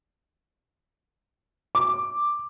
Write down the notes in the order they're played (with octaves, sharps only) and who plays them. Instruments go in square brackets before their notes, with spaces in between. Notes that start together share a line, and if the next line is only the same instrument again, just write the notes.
[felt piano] D6